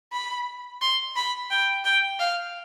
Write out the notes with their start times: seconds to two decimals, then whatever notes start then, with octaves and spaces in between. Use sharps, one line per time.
0.12 B5
0.82 C6
1.16 B5
1.51 G5
1.84 G5
2.19 F5